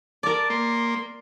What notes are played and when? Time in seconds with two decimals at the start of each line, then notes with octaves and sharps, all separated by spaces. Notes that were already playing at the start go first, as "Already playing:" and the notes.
0.23 A#4 D5 A5
0.50 A#3 C6